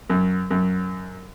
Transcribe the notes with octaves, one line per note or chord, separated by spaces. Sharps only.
F#2
F#2